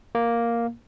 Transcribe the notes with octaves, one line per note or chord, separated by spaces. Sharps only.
A#3